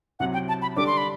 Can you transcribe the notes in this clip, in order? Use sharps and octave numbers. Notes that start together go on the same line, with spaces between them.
C2 C3 F#3 F#5
G5
A5
B5
D3 G3 D4 A4 D6
C6
B5